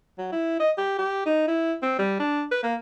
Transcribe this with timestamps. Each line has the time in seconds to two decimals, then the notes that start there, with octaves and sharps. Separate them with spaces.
0.18 F#3
0.32 E4
0.60 D#5
0.78 G4
0.98 G4
1.26 D#4
1.48 E4
1.82 C4
1.99 G3
2.20 D4
2.51 B4
2.63 A#3